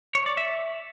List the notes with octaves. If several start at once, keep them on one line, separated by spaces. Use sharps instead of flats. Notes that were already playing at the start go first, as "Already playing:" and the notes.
C#5
D5
E5